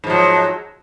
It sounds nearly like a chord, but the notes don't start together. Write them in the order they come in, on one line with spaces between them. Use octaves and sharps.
G#2 F3 F#3